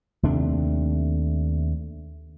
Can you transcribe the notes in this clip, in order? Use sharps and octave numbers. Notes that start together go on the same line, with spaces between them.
D#2 C3 A3 D4